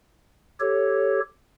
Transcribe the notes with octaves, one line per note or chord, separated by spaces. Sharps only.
G4 A4 C#5